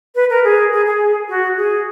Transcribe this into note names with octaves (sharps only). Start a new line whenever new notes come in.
B4
A#4
G#4
G#4
G#4
F#4
G#4